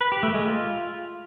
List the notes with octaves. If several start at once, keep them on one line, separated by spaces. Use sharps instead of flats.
B4
G4
A3
G#3
F4